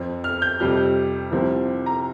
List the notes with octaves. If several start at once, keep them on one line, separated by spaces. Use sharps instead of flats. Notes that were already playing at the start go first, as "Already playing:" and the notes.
Already playing: F2 F3
F6
G6
F2 C3 G3 F6
C2 C3 F3
A#5